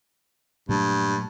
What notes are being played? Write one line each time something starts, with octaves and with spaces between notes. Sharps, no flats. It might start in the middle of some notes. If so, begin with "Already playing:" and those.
G2 A#2 F#3 A3